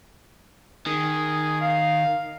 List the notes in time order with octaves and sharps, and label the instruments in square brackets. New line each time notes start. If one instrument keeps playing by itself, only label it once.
[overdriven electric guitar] D#3 [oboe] G#4
[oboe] F5